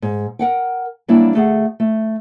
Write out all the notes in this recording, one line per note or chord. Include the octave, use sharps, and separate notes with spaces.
G#2
A#4 F#5 G5
F#3 G3 A#3 D4 E4
D2 A3 G#4 F#5
A3